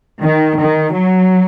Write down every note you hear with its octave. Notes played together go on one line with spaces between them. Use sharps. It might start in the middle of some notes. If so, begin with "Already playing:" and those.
D#3
D#3
F#3